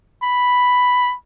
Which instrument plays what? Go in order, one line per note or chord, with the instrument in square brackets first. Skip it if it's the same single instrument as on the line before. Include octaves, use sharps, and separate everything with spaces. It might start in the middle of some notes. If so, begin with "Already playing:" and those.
[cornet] B5